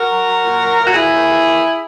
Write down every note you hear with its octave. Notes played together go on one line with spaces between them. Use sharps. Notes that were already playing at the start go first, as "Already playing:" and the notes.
Already playing: F#4 A#4
F#3
F#3
A#2
F#3
A#2
F#4
D#2 E4 G#4
D#2
D#2
D#2